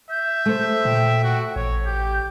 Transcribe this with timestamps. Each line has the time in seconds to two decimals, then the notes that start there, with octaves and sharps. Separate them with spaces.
0.10 E5 G6
0.46 A3 C5
0.85 A#2 G5
1.24 F#4
1.56 A1 C#5
1.86 G4 G6